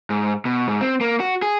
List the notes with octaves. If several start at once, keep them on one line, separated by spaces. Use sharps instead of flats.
G#2
B2
G#2
C4
A#3
F#4
G#4